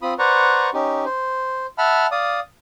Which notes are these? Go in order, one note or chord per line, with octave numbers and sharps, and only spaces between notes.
C4 F4 B5 D#6
B4 C5 D5 F#5 A#5 C#6
C#4 D#4 G4
C5
E5 F#5 A5 B5 F6
D5 F5 D#6